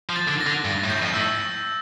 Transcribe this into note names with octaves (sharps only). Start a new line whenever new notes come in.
F3
A6
D3
A#6
D3
G2 A6
A2
G6
F2
A2 E6